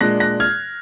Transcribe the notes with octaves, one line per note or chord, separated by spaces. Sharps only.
A#2 G#3 D4 F#6 A#6
F#6 A#6
F6 G#6